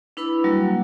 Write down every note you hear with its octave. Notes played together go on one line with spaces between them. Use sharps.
D4 E4 B4 B5 E6
F#3 G3 A#3 F#4